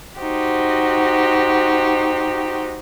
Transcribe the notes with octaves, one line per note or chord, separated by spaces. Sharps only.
D#4 F#4 G4 C5